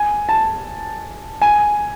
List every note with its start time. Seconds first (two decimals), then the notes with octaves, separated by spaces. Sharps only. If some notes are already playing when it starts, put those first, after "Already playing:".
Already playing: G#5
0.29 A5
1.42 G#5